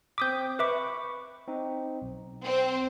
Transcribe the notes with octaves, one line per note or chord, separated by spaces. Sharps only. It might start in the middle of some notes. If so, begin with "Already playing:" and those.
C4 D6 D#6 G6 B6
B4 E5 B5 C#6 D6
C4 D#4
B1
C4